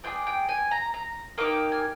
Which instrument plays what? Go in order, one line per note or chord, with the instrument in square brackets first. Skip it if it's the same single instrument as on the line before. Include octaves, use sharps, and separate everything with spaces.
[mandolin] D4 F4 G#4 G5
G5
G#5
A#5
A#5
A#3 D#4 G4 D6
G#5